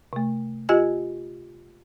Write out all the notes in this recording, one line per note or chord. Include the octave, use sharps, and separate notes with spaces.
C3 A3
F4 G4 D#5 G#5 G#6